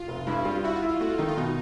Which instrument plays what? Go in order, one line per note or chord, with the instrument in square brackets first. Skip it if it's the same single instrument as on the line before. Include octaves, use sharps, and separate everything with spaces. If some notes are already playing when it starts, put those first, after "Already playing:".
Already playing: [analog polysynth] F4
[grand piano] F1
[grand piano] G2 [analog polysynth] E4
[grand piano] G3 [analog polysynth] F4
[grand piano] E4 [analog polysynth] F#4
[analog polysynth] F4
[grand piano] E4
[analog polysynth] F4
[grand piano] A3 [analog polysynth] F#4
[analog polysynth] F4
[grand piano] D#3 [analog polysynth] D#4
[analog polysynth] F4
[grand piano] B2 [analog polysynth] D#4